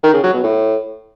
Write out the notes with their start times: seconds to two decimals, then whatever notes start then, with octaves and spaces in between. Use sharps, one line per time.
0.03 D#3
0.13 C#3
0.23 F#3
0.34 B2
0.44 A2